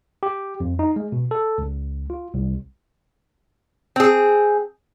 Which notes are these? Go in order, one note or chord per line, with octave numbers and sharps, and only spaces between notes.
G4
F2
D#4
G#3
B2
A4
C#2
F4
C2
C4 G#4